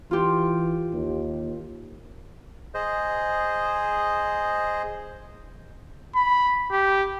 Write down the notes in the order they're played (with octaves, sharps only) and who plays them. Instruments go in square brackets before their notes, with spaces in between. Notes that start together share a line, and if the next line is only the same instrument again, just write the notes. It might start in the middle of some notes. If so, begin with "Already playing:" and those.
[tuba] E3 [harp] F4 G4
[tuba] D#2
[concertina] G#4 C5 D#5
[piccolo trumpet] B5
G4